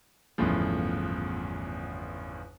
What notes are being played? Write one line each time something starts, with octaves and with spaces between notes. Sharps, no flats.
G1 E2 A2 C#3 F3